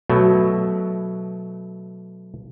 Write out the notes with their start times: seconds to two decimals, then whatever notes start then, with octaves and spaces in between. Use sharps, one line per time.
0.09 B2 F#3 A3